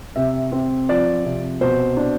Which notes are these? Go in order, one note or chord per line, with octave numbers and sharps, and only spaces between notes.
C3 E5
C4
F3 D5
C3
B2 C5
D4